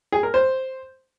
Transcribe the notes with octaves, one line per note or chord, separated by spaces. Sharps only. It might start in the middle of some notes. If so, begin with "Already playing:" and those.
G#4
A#4
C5